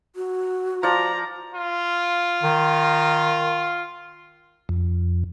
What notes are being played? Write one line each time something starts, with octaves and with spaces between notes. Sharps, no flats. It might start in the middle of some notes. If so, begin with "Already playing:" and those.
F#4
F3 D5 A#5
F4
D#3
F2